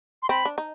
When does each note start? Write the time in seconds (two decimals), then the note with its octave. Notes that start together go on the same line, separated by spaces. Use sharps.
0.23 C6
0.29 C4 B5
0.45 D4
0.58 D#4